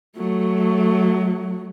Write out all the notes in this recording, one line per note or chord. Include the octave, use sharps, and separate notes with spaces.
F#3 A3